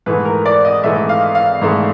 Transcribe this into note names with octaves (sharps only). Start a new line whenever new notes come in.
G#2 E3 A3 B4
A#4
D5
D#5
G#2 E3 A3 E5
F5
F5
G#2 E3 A3